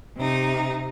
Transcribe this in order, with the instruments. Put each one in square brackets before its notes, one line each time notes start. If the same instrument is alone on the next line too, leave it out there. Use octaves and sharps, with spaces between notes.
[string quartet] C3 D#4